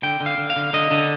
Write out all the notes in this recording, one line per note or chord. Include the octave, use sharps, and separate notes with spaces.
D3 G5
D3
F5
D3
F5
D3
D3 D#5
D3